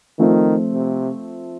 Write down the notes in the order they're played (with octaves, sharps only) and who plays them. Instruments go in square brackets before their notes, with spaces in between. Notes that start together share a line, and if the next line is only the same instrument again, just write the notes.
[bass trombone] D#3 [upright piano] F3 A3 C4
[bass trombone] C3